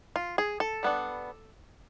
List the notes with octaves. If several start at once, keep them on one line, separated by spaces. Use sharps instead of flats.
F4
G#4
A4
G3 B3 D4